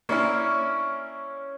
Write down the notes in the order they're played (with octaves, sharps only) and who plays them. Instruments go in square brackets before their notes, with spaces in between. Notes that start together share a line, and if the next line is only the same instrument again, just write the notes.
[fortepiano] A#3 D4 E4 [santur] C#4 C#5